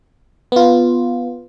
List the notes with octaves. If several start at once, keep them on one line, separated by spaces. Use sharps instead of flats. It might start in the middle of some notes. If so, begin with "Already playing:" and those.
B3 F4